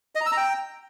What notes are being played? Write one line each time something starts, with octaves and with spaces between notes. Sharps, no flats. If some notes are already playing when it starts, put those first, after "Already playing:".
D#5
A#5
E6
A#5
G5